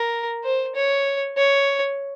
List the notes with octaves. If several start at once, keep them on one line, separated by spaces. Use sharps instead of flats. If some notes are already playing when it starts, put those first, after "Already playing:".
Already playing: A#4
C5
C#5
C#5